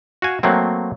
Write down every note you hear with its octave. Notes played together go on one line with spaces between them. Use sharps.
F#4 F5 G#5
F#3 A3 A#3 C4